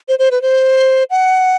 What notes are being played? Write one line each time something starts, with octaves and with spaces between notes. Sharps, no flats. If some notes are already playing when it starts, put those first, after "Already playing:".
C5
C5
B4
C5
F#5